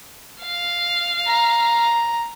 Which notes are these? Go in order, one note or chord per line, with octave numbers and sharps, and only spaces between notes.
F5
A#5